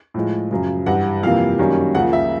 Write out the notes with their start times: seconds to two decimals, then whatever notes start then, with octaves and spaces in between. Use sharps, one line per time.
0.14 A2 F3 G#3
0.50 F#2 C#3 F3
0.86 G2 E3 G3 F#5
1.23 F2 C3 E3 G3 A#3 F5
1.59 F#2 D#3 G3 A#3 C#4
1.95 C#2 C#3 F3 A#3 F#5
2.13 E5